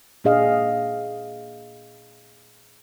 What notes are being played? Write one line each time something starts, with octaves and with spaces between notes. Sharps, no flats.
A#2 D4 G#4 D#5 F5